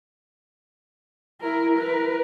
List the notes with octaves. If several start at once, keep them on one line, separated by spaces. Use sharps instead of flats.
E4 A#4
A#4 B4